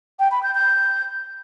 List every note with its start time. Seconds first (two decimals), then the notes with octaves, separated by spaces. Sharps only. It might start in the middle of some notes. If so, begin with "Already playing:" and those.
0.20 G5
0.31 B5
0.43 G6
0.55 G6